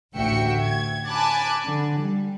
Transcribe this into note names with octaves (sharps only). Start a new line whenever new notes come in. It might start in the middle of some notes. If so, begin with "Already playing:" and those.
A1 D2 F#4 E5 G5 C#7
G#6
G#5 A5 B5 D6 F#6 A6
D3
G3